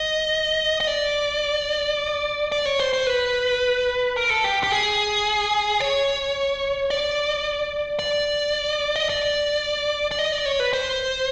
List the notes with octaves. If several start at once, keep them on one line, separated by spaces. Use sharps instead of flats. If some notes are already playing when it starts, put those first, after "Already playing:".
Already playing: D#5
D#5
D5
D5
C#5
C5
C5
B4
A#4
A4
G4
G4
G#4
C#5
D5
D5
D#5
D5
D5
D#5
D5
C#5
B4
C5